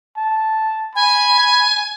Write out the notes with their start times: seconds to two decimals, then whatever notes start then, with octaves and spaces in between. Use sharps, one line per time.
0.17 A5
0.95 G#5 B5